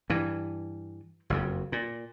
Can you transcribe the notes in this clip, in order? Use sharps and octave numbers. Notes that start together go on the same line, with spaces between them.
G2 E3
F#1 F2 C#3
A#2